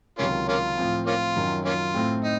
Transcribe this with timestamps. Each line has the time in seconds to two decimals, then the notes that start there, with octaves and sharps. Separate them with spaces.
0.18 C#2 C3 D#3 F#3 A#3 C#4 F4
0.49 A#3 C#4 F4
0.78 A2 F3 C4
1.06 A#3 C#4 F4
1.36 F#2 D#3 F#3
1.65 A#3 C#4 F4
1.94 A2 A3 C4
2.24 D#4